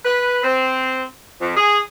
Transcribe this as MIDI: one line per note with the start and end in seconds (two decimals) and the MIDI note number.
0.05 0.39 71
0.44 1.02 60
1.40 1.53 41
1.57 1.79 68